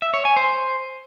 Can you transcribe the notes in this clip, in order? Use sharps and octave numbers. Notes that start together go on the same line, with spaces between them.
E5
C#5
G#5
C5